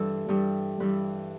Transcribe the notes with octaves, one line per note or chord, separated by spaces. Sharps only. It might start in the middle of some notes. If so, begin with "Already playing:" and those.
Already playing: G2 E3 G3 A4
G2 E3 G3
G2 E3 G3 B4